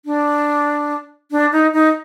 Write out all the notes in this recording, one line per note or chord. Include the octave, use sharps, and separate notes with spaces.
D4
D4
D#4
D#4